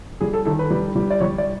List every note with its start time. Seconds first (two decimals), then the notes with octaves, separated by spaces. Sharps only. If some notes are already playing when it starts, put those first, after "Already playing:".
0.21 G3 G#4
0.33 A4
0.45 D#3 A4
0.59 B4
0.71 G3
0.96 G3
1.10 D5
1.20 G3 C#5
1.38 D5